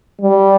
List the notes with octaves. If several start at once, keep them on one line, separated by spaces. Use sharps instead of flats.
G3